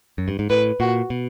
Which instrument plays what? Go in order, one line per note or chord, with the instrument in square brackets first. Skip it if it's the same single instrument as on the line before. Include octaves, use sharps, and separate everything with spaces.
[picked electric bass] F#2
G2
G#2
[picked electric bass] A2 [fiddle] B4
[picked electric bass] A#2 [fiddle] F#4
[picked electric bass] B2